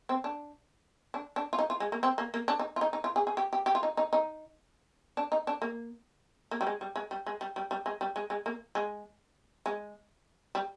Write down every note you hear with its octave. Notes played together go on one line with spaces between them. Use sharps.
C4
D4
D4
D4
F4
D#4
F4
G#3
A#3
C4
A#3
A#3
D4
D#4
F4
D#4
D#4
F4
G#4
G#4
G4
G4
G4
F4
D#4
D#4
D#4
D4
D#4
D4
A#3
A#3
G3
G#3
G3
G#3
G3
G#3
G3
G3
G3
G#3
G3
G#3
G#3
A#3
G#3
G#3
G3